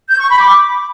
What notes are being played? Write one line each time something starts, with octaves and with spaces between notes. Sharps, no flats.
G6
C#6
B5
D6